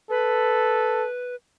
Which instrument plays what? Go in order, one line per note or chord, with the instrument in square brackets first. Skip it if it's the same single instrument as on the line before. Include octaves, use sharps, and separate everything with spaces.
[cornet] A4 [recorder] B4